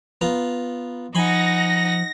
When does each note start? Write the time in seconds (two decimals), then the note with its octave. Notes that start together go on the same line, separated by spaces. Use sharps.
0.21 B3 F4 A#5
1.15 F3 D#4 F#5 G#5 B5 C6 A#6